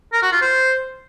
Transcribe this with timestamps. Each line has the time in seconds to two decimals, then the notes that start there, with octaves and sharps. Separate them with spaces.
0.13 A#4
0.22 F#4
0.32 F4
0.41 C5